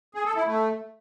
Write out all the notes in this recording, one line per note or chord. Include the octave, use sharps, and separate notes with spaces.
G#4
A4
E4
A3